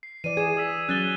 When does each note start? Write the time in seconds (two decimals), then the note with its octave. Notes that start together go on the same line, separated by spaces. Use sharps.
0.03 C7
0.24 E3 D5 D#7
0.37 G#4 G#6 E7
0.57 D#6 E6 B6
0.89 F#3 C#4 F#6 A6 G7